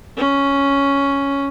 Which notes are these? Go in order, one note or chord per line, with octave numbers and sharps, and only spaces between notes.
C#4